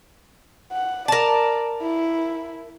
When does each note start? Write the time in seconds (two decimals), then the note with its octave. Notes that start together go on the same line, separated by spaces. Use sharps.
0.72 F#5
1.08 A#4 D5 A5
1.82 E4